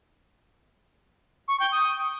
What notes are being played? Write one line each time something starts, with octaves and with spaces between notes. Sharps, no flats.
C#6
G5
D#6